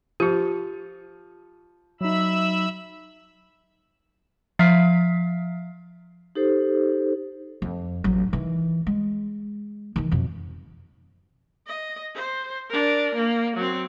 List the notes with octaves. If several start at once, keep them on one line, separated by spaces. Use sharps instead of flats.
F3 F4 G4
F#3 D#4 E5 B5 E6
F3 E5 F5 F6 B6 C7
D#4 G4 A4 C5
F2
A1 F#3
D#3 E3
G#3
D#3 E3
F2 B2
D#5
C5
D4 A#4
A#3
F#3 C4